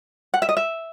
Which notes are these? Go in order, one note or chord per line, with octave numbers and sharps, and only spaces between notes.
F#5
E5
D#5
E5